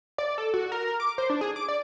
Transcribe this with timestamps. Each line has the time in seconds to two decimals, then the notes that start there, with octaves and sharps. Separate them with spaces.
0.18 D5
0.38 A4
0.54 F#4
0.72 A#4
0.87 A#4
1.00 D6
1.18 C5
1.30 D4
1.41 G#4
1.56 D6
1.68 D5